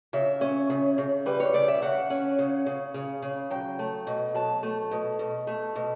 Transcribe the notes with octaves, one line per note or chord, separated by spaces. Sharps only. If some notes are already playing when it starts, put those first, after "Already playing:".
C#3 E5
C#4
C#3
C#3
G3 B4
C#5
C#3 D5
E5
C#3 F#5
C#4
C#3
C#3
C#3
C#3
F#3 G5
A3
B2
F#3 A5
A3
B2
B2
A3
B2